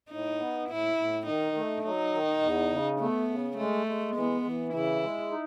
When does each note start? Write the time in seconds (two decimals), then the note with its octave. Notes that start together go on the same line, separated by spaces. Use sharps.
0.11 A2 D#4
0.40 B3
0.69 A2 E4
0.97 A2
1.26 D#3 D#4
1.56 A3
1.85 F#3 D#4
2.13 D#3
2.42 E2
2.71 C#3
3.00 A3 B3
3.30 C#3
3.58 G#3 A3
3.87 G#3
4.16 E3 B3
4.45 E3
4.73 C#3 E4
5.02 G#3
5.31 D#4